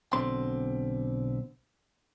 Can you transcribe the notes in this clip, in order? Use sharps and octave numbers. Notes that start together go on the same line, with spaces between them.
B1 B2 D3 C4 C6